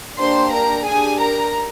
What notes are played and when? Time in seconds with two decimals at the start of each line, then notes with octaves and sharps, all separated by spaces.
0.18 A#3 D4 G4 C5 C6
0.52 A#4 A#5
0.85 D4 G4 G#4 G#5
1.19 A#4 A#5